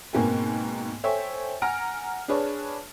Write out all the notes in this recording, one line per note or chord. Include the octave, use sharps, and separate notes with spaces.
G#2 B2 A#3 C4 G5 G#5
A4 C5 C#5 E5 G5 G#5
F#5 G#5 A#5 F6 A#6 D7
D4 G#4 B4 C#5 A5